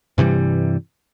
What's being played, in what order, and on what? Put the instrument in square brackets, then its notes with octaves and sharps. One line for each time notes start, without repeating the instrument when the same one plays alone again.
[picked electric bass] G2 C3 E3 G3